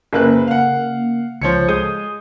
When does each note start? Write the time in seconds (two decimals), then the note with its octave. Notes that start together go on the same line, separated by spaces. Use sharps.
0.13 F#1 C#3 A#3 B4 F#6
0.47 F5 F#5
1.42 C#2 F3 C5 C#5 C#7
1.68 G#3 D#6 G6